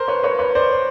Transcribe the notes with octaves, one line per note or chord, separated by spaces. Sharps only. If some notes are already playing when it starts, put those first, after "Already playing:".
Already playing: A#4 C5
B4 C#5
B4 C#5
B4 C#5
C5 D5